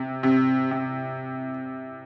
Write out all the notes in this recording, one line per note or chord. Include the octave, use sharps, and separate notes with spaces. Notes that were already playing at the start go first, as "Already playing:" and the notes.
Already playing: C3
C3
C3